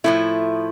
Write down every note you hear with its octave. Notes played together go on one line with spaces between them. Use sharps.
A2 F3 A3 E4